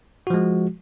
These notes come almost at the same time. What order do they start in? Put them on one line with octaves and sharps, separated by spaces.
F#4 F3 G#3